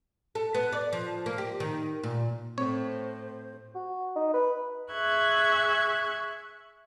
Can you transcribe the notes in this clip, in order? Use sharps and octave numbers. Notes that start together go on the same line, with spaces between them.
A4
B3
D5
F3
A#3
G4
D#3
A#2
A2 C4 C5 C#5
F#4
D#4
B4
G#4 E5 C#6 F#6 G#6